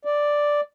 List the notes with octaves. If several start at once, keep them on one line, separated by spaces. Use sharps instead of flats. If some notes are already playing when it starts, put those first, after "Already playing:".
D5